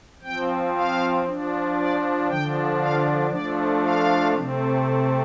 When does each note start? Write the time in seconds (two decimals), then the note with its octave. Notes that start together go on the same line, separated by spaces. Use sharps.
0.23 F3 C4 G5
0.74 F5
1.25 F3 D4
1.77 D5
2.28 D3 F3 D4 G5
2.79 F5
3.30 F3 A3 D4 D5
3.81 F5
4.33 C3 A3 C4